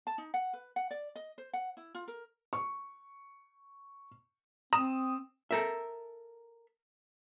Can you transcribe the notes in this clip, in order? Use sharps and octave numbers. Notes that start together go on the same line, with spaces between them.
A5
D#4
F#5
B4
F#5
D5
D#5
C5
F#5
E4
F4
A#4
C#6
C4 A#5 D#6 E7
A4 A#4 E5